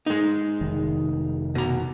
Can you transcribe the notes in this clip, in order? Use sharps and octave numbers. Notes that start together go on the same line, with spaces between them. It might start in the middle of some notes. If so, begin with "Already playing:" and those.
G#3 D#4
F1 D#3
B2 A#5